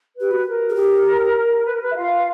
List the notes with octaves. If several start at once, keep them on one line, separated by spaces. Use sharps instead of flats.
G4 B4
F#4
A#4
G#4
G4
B4
A#4
B4
E5
F4 F5